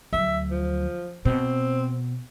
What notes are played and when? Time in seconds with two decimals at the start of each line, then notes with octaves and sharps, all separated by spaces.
0.13 D2 F#3 E5
0.51 F3
1.25 B2 C4